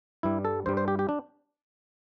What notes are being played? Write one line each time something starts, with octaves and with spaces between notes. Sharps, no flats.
G2 G3 E4
A4
G2 G3 C5
C5
G4
G4
D4